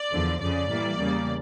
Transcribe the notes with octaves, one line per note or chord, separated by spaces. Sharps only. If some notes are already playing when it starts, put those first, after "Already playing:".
Already playing: D5
E2 D3 F3
F2 C#3 F3 D5
A2 E3 G3 A#3
E2 C#3 G3 A#3